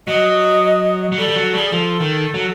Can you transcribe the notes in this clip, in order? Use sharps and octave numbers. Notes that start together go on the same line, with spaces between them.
F#3 D#5
F#3
G3 A4
G3
F#3
G3 G#4
F3 A4
D#3
F#3